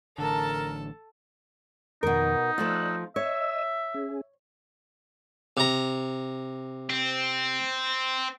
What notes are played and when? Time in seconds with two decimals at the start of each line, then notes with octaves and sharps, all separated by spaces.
0.18 A1 D3 A4 A#4 A5
2.03 F2 B2 D#3 D#4 A#4
2.58 F3 A3 F4 D5 E6 F#6
3.16 C#5 D#5 E5 E6
3.94 C#4 G#4
5.57 C3 A#5
6.90 C4